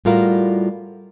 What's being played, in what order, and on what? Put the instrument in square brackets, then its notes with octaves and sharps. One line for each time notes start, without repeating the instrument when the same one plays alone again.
[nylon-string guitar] A2 G3 F4 F#4 A#4 F5